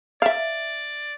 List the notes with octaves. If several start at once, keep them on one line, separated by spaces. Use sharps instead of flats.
D5 E5 F5